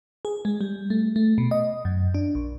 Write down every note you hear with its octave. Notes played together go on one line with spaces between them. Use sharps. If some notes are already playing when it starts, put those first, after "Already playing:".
G#4
G#3
G3
A3
A3
B2
D#5
F#2
D4
A#1